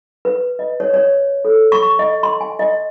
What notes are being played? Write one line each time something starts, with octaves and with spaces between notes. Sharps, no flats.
B4
D#5
C#5
C#5
A4
C#6
D#5
C6
G#5
D#5